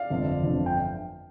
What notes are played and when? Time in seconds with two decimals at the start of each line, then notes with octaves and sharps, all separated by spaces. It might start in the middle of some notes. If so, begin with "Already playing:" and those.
Already playing: D5 F5
0.10 G1 F2 D3
0.43 G1 F2 D3
0.66 G5